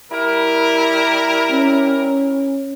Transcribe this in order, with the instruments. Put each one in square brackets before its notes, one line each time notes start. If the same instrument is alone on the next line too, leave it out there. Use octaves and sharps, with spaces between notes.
[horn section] G3 E4 A#4
[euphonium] C#4